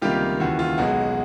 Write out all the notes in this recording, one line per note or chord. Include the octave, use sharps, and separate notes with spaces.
C#2 C3 D#3 G3 A#3 F4 G4
D#2 C#3 E3 F#4
F4
B1 B2 G#3 F#4